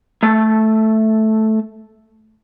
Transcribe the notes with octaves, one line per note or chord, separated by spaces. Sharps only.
A3 A5